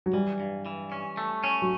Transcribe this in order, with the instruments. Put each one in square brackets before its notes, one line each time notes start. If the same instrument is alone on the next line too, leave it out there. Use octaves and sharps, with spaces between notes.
[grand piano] F#3
[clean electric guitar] E3 [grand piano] G3
[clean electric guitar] G2
E3
C#4
A3
C#4
[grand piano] F#3